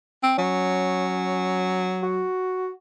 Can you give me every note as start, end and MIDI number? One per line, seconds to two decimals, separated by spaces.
0.23 0.34 60
0.38 2.26 54
0.38 1.93 61
2.03 2.70 66